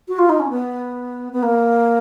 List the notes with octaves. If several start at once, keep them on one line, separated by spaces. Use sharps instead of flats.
F#4
F4
D#4
C#4
B3
B3
A#3